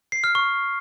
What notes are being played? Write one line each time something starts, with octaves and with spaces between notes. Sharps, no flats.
C7
F6
C#6